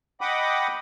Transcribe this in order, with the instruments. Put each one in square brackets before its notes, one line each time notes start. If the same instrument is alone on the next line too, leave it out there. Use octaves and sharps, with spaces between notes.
[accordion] D#5 F#5 G5 B5 D6 D#6